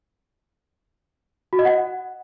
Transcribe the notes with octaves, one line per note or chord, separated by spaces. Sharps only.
F#4
D#5
F#5